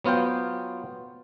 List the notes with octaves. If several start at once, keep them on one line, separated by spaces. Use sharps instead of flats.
F#3 B3 F4 C5 G5